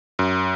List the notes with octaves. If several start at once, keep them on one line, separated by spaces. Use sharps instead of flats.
F#2